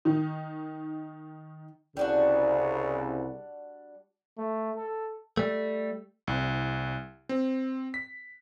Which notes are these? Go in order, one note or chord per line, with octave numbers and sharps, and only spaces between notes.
D#3 D#4
C2 C#3 G3 D4 F#4
A3
A4
G3 A3
C2
C4
B6